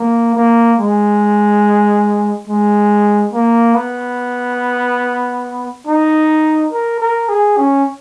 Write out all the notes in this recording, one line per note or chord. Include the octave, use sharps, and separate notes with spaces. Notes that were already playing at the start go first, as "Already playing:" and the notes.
Already playing: A#3
A#3
G#3
G#3
A#3
B3
D#4
A#4
A#4
G#4
C#4